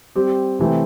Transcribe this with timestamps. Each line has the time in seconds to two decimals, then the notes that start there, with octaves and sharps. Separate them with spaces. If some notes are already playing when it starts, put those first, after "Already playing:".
0.15 G3 C4 G4
0.59 C3 E3 A3 C4